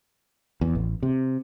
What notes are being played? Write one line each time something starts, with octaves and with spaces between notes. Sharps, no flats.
E2
A1
C3